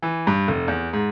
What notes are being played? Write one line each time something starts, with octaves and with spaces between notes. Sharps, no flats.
E3
G2
F1
E2
G#2